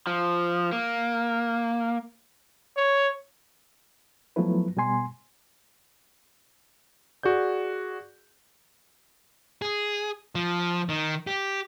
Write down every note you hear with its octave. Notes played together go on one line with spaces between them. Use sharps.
F3
A#3
C#5
F3 F#3 A3 B3 E4 B4
B2 G3 B3 G#5 C6
F#4 G#4 D5 G6
G#4
F3
D#3
G4